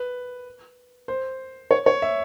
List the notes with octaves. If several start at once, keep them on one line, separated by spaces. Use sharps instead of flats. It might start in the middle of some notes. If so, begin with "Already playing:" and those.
Already playing: B4
C5
C#5
C#5
E5